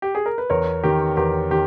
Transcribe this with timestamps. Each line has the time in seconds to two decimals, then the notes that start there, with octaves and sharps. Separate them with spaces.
0.02 G4
0.15 G#4
0.26 A#4
0.38 B4
0.50 E2 A#4 C#5
0.83 D#3 G4 A#4
1.17 E2 G4 A#4
1.51 D#3 G4